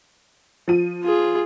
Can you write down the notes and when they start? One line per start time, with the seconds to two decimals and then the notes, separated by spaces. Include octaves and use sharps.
0.68 F3 D#7
1.04 F4 G#4